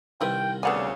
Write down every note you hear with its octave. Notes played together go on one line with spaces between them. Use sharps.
C2 D#3 C4 E4 B4 G5
D2 C#3 B3 D5 F#5 G#5